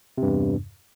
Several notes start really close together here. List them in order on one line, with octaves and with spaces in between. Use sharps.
C3 G2 E2